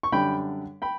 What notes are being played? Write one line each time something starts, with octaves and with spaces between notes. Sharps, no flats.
C#6
F#2 D3 G3 D4 G5 B5
G5 B5